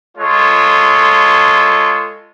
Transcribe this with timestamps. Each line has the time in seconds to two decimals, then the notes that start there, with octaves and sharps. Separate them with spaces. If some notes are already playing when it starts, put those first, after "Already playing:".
0.18 G#3 F4 A4 C#5